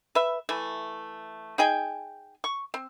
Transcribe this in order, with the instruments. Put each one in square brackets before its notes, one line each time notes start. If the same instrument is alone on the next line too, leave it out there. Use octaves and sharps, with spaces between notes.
[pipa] B4 E5
E3 A3
D#4 G#4 G5 G#5
C#6
C4